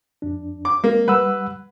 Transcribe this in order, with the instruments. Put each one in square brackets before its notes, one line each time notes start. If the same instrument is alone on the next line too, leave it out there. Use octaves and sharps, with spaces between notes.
[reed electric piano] F2 D4
[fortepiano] D6
[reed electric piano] G#3 [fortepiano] A#3
[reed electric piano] G3 F#5 E6 [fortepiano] B4